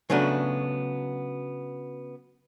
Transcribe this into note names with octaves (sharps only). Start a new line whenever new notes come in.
C#3 F#3 A3 B3 D4